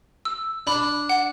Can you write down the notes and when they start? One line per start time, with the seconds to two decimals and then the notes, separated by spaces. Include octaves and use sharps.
0.25 E6
0.67 D4 B5
1.09 F#5